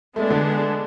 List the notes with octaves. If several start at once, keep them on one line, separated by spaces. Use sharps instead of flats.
G#3 A3 B3 D4
D3